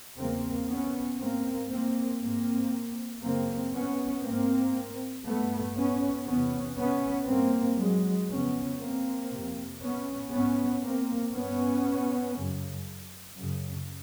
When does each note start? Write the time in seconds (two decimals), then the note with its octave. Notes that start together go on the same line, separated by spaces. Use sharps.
0.18 E2 C#3 A#3 C4
0.69 B3 C#4
1.20 G#2 A#3 C4
1.71 A#3 C4
2.21 G#2 A#3 C4
3.23 F#2 C#3 A#3 C4
3.74 B3 C#4
4.24 G#2 A#3 C4
5.26 G2 A3 B3
5.76 B3 C#4
6.27 E2 C3 B3 C#4
6.78 B3 C#4
7.28 G2 A#3 C4
7.79 F#3 G#3
8.30 F2 C#3 B3 C#4
8.81 A#3 C4
9.32 F2 C3
9.83 B3 C#4
10.32 G#2 B3 C#4
10.83 A#3 C4
11.34 G2 B3 C#4
12.35 F#2 C#3
13.37 F#2 C#3